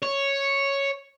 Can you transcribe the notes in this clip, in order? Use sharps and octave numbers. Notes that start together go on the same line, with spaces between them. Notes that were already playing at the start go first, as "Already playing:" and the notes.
C#5